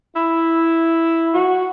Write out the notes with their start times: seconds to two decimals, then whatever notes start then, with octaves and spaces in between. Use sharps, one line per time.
0.15 E4
1.34 F#4